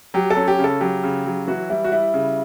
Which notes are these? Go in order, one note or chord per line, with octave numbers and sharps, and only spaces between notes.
F#3 G4
A4
C#4
G4
C#3 A4
F#3 G4
C#3
F#3
E3 F#4
G3 E4
F#4
G3 E4
C#3